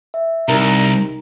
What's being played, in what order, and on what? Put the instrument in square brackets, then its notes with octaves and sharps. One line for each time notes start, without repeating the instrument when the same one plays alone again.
[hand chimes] E5
[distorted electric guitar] C2 [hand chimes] D#4 G4 A#4 [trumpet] A#5